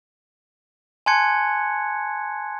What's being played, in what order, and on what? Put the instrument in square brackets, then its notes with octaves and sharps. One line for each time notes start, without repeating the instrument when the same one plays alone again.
[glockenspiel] G#5 A5 C6 F#6 G#6 C#7